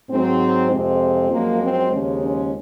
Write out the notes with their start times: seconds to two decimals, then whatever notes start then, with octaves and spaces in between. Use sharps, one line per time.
0.11 G#2 F#3 C4
0.72 F2 C3 F3 G#3 C4
1.31 F#2 F3 G#3 A#3
1.62 C4
1.92 D#2 C#3 F3 G#3 C#4
2.22 C#4